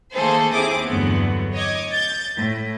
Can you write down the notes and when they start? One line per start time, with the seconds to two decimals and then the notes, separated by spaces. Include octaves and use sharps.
0.14 D#3 A3 A#3 G#4 A4 C5
0.54 D#2 C4 E4 G#4 D6 D#6
0.86 E2 G2 D3 F#3 A3 B3
1.53 C#5 D#5 D6 G#6
1.90 G6 A6
2.36 A2